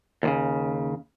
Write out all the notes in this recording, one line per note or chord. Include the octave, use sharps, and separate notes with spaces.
D#2 A2 C#3